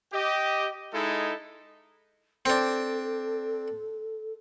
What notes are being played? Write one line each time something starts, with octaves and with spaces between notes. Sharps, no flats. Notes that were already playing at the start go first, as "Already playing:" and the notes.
G4 D#5
G#3 D#4 E4 A4
C4 D4 A4